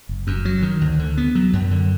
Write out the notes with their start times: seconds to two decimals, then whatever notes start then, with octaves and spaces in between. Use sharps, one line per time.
0.09 F#1
0.27 F#2
0.45 F#3
0.62 D#3
0.81 D2
0.99 D3
1.17 B3
1.35 F#3
1.53 F#2
1.71 D3